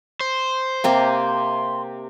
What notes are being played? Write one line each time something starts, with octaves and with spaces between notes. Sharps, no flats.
C5
C3 A#3 G4